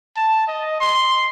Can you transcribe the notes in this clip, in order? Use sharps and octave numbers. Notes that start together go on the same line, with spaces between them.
A5
D#5
C6